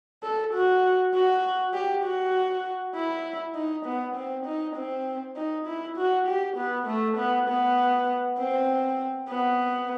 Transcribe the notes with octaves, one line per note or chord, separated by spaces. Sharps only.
A4
F#4
F#4
G4
F#4
E4
D#4
B3
C4
D#4
C4
D#4
E4
F#4
G4
B3
A3
B3
B3
C4
B3